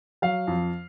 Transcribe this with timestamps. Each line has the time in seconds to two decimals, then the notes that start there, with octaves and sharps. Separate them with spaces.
0.22 F#3 F5
0.47 F2